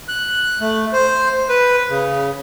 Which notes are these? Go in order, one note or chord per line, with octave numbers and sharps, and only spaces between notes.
F#6
A3
C5
B4
C#3